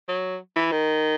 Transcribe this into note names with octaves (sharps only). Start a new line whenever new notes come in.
F#3
E3
D#3